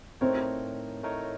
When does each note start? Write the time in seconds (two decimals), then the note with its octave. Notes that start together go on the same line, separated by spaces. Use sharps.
0.21 A2 A3 C4 D#4 A#4 C#5
1.03 A2 A3 D#4 A#4 C#5